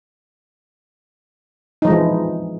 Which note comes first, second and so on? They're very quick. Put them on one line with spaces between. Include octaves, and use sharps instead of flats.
D#4 F3 G#3 E3